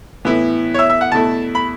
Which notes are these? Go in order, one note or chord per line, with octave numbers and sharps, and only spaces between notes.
A2 E3 B3 E4
C#5
E5
E5
F#5
E2 B2 A3 E4 A5
B5